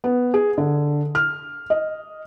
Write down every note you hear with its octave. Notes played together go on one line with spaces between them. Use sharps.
B3
G#4
D3
F6
D#5